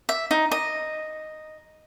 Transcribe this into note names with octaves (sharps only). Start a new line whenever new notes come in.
E5
D#4
D#5